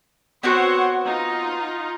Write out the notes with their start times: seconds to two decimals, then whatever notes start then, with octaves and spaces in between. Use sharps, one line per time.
0.43 B3 C4 F#4 C5 C#5 F#5
1.04 D#4 F4